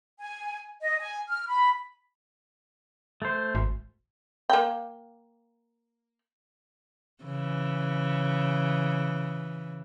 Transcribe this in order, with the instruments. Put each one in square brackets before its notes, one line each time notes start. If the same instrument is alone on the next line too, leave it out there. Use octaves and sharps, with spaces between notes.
[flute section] G#5
D#5
G#5
F6
B5
[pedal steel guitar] A3 C5
[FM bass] G#1
[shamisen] A#3 G5
[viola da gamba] C#3 E3